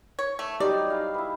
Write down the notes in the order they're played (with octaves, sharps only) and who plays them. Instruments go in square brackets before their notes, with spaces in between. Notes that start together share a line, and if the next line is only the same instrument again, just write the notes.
[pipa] C#5
A3
[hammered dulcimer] F#3 B3 D#4 [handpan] G4 [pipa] D5
[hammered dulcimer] E4 G#4 F5
E4 B4